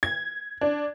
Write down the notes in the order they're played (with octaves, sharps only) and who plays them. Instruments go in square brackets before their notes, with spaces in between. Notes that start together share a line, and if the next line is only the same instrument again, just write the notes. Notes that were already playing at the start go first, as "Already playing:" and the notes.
[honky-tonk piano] G#6
D4